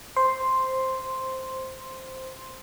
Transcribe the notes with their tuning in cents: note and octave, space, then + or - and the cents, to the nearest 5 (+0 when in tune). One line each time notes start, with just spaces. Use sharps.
C5 +0 C6 +0